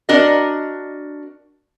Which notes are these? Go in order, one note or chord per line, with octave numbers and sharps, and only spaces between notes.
D4 F#4 A#4 D#5